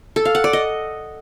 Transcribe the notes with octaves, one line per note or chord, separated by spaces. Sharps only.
A4
F5
F#5
D5
D#5